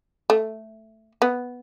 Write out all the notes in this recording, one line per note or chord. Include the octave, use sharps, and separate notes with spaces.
A3
B3